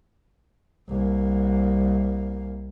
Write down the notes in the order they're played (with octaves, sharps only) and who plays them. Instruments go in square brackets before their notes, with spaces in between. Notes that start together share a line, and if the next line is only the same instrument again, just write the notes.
[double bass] C2 A#3